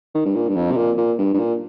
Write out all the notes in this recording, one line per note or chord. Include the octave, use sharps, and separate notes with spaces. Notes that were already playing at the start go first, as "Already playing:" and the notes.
D#3
G2
A#2
G2
F2
C3
A#2
A#2
G2
G2
A#2